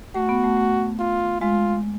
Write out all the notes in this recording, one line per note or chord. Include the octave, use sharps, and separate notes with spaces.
A3 F#4
B3
A3
A3
F4
G#3 F4